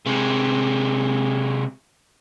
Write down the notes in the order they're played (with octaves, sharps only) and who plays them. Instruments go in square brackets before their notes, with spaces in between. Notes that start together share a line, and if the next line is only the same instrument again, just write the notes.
[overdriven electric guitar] C3 G#3